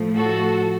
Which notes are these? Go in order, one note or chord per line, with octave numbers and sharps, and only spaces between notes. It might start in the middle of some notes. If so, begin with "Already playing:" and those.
Already playing: A2 F3 A3
F#4 A4